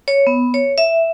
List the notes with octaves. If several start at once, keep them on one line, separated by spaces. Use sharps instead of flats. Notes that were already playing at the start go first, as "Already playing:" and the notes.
C#5
B3
C#5
E5